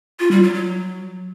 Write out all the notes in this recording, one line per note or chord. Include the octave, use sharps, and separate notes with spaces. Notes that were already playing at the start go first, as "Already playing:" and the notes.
F4
G3
F#3
F#3